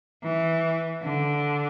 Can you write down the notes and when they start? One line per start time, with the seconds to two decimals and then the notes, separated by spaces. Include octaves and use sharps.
0.23 E3
1.02 D3